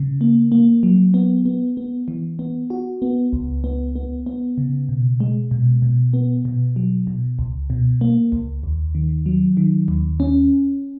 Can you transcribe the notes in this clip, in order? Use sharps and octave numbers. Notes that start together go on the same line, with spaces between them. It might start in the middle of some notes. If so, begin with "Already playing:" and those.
Already playing: C#3
A#3
A#3
F#3
B3
B3
B3
E3
B3
F#4
B3
C#2
B3
B3
B3
C#3
B2
G#3
B2
B2
B3
B2
F#3
B2
C#2
B2
A#3
C#2
D#2
D#3
F#3
D#3
D#2
C#4